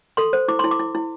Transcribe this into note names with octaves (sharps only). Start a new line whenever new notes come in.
A4 C6
C5
E4 D6
E4 C6
D6
E4
E4